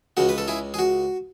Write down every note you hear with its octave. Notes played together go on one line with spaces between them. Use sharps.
C#2 C#3 G#3 F#4
B4
A4
E4 G#4
G#4
F#4